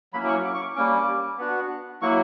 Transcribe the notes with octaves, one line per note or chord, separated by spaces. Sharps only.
F#3 A#3 C#4 E4 B5
D6
C#6
D6
C#6
D6
G3 A#3 C#4 D6
B3 D4 F#4
F#3 A#3 E4 C#6